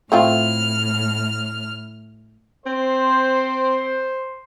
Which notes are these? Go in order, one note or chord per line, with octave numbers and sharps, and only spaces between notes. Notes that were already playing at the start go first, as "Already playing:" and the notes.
A2 A3 C4 F4 F6
C4 C5